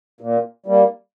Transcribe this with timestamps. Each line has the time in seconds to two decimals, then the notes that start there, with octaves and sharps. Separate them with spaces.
0.21 A#2
0.66 G3 A#3